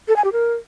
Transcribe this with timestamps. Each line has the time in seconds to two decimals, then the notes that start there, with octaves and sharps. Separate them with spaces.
0.08 A4
0.16 G#5
0.24 G4
0.32 A#4